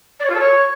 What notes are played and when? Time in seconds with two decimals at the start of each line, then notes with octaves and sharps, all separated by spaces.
0.19 D5
0.24 C#5
0.29 F4
0.34 A4
0.39 C#5